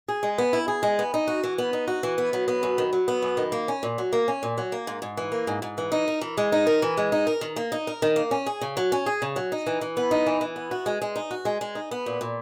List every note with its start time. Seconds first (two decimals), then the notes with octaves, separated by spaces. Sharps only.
0.08 G#4
0.23 G#3
0.38 B3
0.53 E4
0.68 G#4
0.83 G#3
0.99 B3
1.14 D#4
1.28 F#4
1.44 E3
1.58 B3
1.73 D#4
1.88 F#4
2.03 E3
2.18 B3
2.33 F#3
2.48 B3
2.63 F#2
2.78 D#3
2.93 F#3
3.08 B3
3.22 F#2
3.37 D#3
3.52 A#3
3.68 C#4
3.83 A#2
3.98 F#3
4.13 A#3
4.28 C#4
4.43 A#2
4.58 F#3
4.72 A#3
4.87 G#2
5.02 G#2
5.17 E3
5.32 A#3
5.47 G#2
5.62 G#2
5.78 E3
5.92 D#4
6.08 A#4
6.21 E3
6.38 G#3
6.52 D#4
6.67 A#4
6.82 E3
6.97 G#3
7.12 D#4
7.27 A#4
7.41 D#3
7.56 A#3
7.72 D#4
7.87 A#4
8.02 D#3
8.16 A#3
8.31 C#4
8.46 G#4
8.61 C#3
8.77 F#3
8.92 C#4
9.06 G#4
9.22 C#3
9.36 F#3
9.52 D#4
9.67 E3
9.81 E3
9.97 B3
10.11 D#4
10.27 E3
10.41 E3
10.56 B3
10.71 F#4
10.86 G#3
11.02 G#3
11.16 D#4
11.31 F#4
11.45 G#3
11.61 G#3
11.75 D#4
11.91 B3
12.06 A#2
12.21 A#2